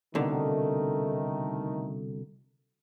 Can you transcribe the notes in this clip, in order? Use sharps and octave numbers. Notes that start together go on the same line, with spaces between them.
C2 B2 D3 D#3 A3